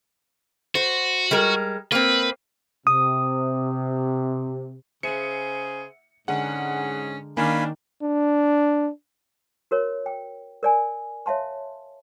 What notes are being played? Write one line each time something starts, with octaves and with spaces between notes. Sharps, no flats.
F#4 C5
G3 G#3 A#4
A#3 C4 B4
C3 D#6
C#3 G#4 C5 E5 F#5 C#7
G#2 D3 G#3 C#4 G#4 A#4 F#5
D#3 A#3 C#4 D4 F5 G#5 B5
D4
F#4 A#4 C#5
G5
A#4 D5 G#5
C#5 E5 F5 A5 C6